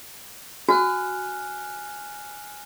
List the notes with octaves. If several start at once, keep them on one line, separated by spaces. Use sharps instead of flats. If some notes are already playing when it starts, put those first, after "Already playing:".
F#4 G#5 F6 F#6